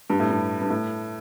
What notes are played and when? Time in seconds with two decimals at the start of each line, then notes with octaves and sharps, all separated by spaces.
0.10 G2
0.20 A2
0.30 G2
0.61 G2
0.70 A2